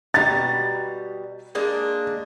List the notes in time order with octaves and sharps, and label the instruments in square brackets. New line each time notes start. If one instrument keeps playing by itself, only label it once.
[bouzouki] B2 G3 A#5 [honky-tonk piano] A6
[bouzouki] G#3 A#3 D4